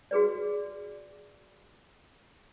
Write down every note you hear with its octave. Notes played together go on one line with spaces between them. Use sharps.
F#4 G#4 B4 D5